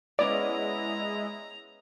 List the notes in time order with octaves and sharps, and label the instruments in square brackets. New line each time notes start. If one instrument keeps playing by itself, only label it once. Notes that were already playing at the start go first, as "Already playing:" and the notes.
[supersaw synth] G#3 E4 D#5 [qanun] B3 C#4 [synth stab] D5 [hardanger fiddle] A#5